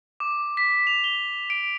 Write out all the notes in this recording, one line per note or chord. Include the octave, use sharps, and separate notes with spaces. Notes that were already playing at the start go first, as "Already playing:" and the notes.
D6
B6
F7
G7
D7